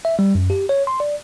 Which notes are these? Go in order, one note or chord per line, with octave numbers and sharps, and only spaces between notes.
E5
G3
F#2
G4
C#5
C6
D5